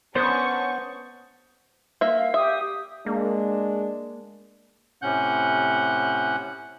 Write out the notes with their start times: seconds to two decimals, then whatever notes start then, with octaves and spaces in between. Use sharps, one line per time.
0.15 B3 C#4 D4 C5 C#6 D#6 G6 A6
2.01 A#3 E5
2.16 F5
2.34 G4 E5 D#6
3.06 G#3 A#3 D4
5.02 A2 C3 C#4 F#5 F#6 G6